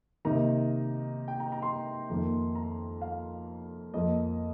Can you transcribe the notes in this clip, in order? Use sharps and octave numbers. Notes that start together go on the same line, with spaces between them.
C3 D#3 A#3 D#4 A#5
G5
A#5
A#5
C6
F2 D#3 A#3
A#5
F5
F2 F3 A#3 D#5